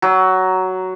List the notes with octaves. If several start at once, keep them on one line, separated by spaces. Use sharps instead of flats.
F#3